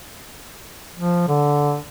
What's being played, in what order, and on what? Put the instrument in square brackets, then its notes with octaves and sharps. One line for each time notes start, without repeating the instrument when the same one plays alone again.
[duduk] F3
D3